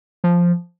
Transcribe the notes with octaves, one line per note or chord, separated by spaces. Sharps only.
F3